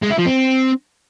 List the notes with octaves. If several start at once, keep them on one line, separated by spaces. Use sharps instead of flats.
G#3
E4
F3
C4